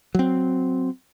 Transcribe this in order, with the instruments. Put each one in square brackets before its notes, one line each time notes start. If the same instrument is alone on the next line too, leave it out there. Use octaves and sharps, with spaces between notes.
[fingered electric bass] F#3 C4